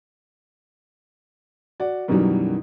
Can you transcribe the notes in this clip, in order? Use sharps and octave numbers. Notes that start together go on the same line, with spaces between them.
F#4 D5 F#5
F#2 B2 D#3 E3 F#3 G3